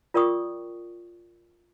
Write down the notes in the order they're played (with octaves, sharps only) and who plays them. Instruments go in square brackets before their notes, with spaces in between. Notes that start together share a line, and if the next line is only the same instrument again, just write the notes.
[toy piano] F4 A#4 D5 G5 C#6 D#6